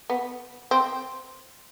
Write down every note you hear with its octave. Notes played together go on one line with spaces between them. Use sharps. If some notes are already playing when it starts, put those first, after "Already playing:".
B3
C4